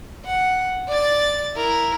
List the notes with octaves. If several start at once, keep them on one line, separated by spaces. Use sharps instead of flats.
F#5
D5 A6
E4 A#4